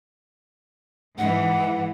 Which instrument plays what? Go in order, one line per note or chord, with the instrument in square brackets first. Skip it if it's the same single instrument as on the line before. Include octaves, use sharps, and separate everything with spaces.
[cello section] G#2 E3 [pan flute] F#5